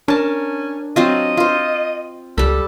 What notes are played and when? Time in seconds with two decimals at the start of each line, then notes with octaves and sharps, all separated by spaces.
0.08 C#4 D4 A#4 A5
0.96 F#3 C4 F4 D#5
1.37 F4 C5
2.38 C#2 G3 A4 B5